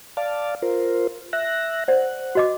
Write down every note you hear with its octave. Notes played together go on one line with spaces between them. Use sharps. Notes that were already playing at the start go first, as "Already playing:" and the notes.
D5 F5 A5
F4 A#4 C5
E5 F#6 A#6
C5 D5 F#5
F#4 D#5 D6